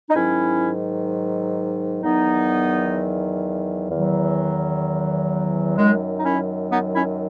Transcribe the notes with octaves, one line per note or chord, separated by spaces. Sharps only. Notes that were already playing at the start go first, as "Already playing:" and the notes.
D#4
G#2 D#3 F#3 C#4 E4
E2 D#3 F#3 B3 D#4
E2 D#3 F#3
F#2 D#3 F#3 G#3
D#4
C#4 E4
B3 D#4
C#4 E4